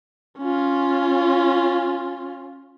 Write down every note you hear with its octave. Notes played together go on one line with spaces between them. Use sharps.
C#4 F4